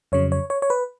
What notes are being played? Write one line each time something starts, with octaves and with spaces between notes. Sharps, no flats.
F2 C#3 F#3 C#5
C#5
C#5
C#5
B4